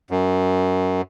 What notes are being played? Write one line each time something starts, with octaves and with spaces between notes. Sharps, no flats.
F#2